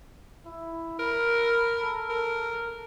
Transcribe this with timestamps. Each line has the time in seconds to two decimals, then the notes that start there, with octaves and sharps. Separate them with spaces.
0.46 E4
1.00 A#4 B5
1.81 A4
2.10 A#4